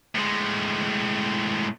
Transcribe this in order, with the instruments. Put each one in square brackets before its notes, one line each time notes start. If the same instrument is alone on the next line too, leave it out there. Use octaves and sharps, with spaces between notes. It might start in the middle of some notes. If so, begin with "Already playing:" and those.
[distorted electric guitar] A2 G#3